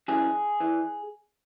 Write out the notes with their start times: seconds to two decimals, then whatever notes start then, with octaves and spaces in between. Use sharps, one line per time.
0.08 F#2 E3 G#4
0.60 E3